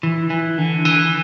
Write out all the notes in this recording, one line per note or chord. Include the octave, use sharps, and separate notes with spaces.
E3
E3
D3
E3